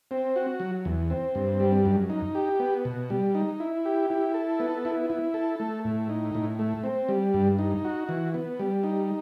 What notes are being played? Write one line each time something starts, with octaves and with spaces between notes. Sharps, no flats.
C4
F#4
F#3
E2
C4
G2
G3
F#2
D#4
G4
B3
B2
G3
D#4
E4
G4
E4
A4
B3
E4
E4
A4
A3
A2
D#4
A2
A3
C4
G3
G2
D#4
F#4
E3
B3
G3
D#4